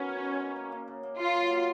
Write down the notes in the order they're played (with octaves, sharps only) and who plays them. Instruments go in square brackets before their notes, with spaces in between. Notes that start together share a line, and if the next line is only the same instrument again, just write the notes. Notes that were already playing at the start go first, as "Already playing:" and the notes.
Already playing: [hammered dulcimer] D#3 F#3 B3 A#4 [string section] C#4
[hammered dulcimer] F#4
G#3
A#4
A#3
A#3
C#3
A#3
[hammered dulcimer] C#3 [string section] F4
[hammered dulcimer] F#3
A#3